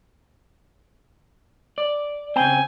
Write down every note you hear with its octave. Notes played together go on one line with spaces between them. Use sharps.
D5
C#3 C4 G5 G#5